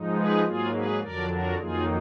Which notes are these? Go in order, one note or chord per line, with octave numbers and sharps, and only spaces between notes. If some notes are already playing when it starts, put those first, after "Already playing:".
Already playing: G#2 F3 G#3 D#4
G#4 B4
G#2 F#3 A#3 F4 G#4
G#4 B4
F2 D3 F#3 D4 A#4 D5
F#4 A#4
F2 D#3 F#3 A#3 D#4 F4 G#4